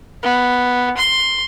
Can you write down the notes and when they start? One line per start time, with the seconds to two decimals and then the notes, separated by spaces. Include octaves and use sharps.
0.23 B3
0.98 C6